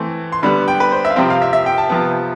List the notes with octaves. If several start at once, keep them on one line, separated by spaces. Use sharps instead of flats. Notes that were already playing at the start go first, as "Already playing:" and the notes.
Already playing: E3 A3 C4
C6
D3 G3 B3 B5
G5
B4
C5
E5
F5
C3 F3 C4 G5
F5
E5
E5
G5
A5
C3 F3 B3